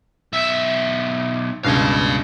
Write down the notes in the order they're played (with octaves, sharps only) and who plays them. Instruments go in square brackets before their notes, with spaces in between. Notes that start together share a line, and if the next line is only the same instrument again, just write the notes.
[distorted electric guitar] B1 E5
[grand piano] C#2 G2 B2 [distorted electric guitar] F5 G#5